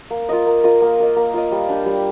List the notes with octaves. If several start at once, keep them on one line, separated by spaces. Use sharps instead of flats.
A#3
F4 A#4 D#5
A#3
F4 A#4 D#5
A#3
F4 A#4 D#5
A#3
F4 A#4 D#5
G3
D4 G4
G3